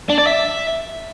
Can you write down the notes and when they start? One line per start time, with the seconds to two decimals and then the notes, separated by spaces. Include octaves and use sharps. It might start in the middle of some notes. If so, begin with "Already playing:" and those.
0.09 D4
0.18 D5
0.27 E5